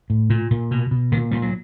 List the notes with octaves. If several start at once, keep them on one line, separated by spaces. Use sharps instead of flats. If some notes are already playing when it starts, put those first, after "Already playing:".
A2
A#2
A#2
B2
B2
A#2 D#3
A#2 G3
F#3